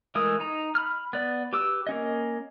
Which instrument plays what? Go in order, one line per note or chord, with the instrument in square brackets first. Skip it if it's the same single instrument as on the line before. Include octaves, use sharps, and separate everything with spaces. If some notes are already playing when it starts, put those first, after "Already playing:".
[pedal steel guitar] E3 G#3 A3 A#4 D#6
D#4 A#5
B5 F6
B3 D5
G4 B4 D6 E6
A#3 C#4 D#5